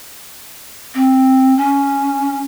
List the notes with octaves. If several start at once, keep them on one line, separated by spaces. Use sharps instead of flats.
C4
C#4